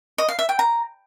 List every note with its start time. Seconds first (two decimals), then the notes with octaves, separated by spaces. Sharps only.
0.18 D#5
0.28 F5
0.39 E5
0.49 G5
0.59 A#5